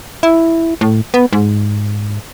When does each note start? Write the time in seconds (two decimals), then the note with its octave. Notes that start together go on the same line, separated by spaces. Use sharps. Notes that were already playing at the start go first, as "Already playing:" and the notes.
0.23 E4
0.81 A2
1.14 B3
1.33 G#2